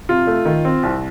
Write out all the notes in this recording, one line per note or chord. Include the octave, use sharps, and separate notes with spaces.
C3 F4
A3
D#3
C4
C2